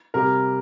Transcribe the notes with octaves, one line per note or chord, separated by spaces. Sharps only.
C3 G3 A#4